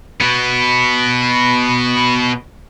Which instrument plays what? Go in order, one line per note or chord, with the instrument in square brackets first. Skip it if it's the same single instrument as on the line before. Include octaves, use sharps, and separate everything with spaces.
[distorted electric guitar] B2 B3